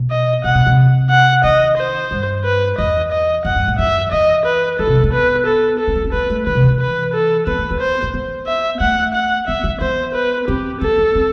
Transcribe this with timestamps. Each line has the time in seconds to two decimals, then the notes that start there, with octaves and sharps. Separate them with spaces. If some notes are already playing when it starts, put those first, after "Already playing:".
Already playing: B2
0.11 D#5
0.44 B2 F#5
0.55 B2
0.67 C3
1.10 F#5
1.44 D#3 D#5
1.78 C5
2.11 G2
2.45 B4
2.78 E2 D#5
3.12 D#5
3.45 F#2 F#5
3.56 G2
3.68 A2
3.79 F#2 E5
4.12 E2 D#5
4.45 B4
4.79 F#2 A4
4.87 C3
4.95 E3
5.04 B3
5.13 B4
5.46 A4
5.79 A4
5.88 C4
5.96 B3
6.04 C4
6.13 B3 B4
6.30 A3
6.46 D#3 B4
6.55 C3
6.64 D#3
6.71 E3
6.80 B4
7.14 A4
7.47 B3 B4
7.58 A3
7.71 B3
7.80 C5
8.02 A3
8.14 B3
8.47 E5
8.80 A3 F#5
9.14 F#5
9.47 B3 E5
9.64 B3
9.81 B3 C5
10.14 B4
10.48 C4 G4
10.81 B3 A4
10.98 B3
11.15 C4